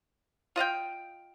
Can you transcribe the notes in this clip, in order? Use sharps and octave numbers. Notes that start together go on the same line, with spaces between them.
F4 D#5 F5 G5